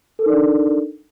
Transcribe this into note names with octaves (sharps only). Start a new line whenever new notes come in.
D4 D#4 A4 A#4 D5